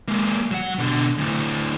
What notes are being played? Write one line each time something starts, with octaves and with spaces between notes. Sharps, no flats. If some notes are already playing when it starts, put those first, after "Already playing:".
G#3 A#3
F#3 F#5
B2 D3
D2 A2